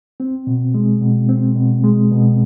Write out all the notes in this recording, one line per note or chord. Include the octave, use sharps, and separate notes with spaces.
C4
B2
G#3
B2
C4
B2
G#3
B2